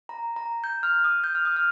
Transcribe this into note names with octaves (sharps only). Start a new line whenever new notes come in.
A#5
A#5
G6
F6
D#6
G6
F6
D#6
F6